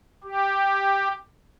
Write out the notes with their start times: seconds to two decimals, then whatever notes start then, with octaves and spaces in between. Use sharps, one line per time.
0.24 G4